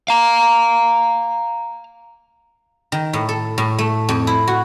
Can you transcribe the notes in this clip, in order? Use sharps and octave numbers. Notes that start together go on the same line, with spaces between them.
F5 A#5
D#3
A2
A4
A2
A3
F2
E4
F#4